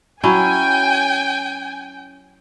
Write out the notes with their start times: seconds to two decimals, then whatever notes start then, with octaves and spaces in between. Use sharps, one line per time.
0.24 F#3 C#4 E4 G5 G#5